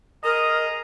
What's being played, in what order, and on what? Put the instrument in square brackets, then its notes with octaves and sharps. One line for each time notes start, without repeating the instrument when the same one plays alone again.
[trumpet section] G#4 A#5 D#6 [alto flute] A#4 [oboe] D#5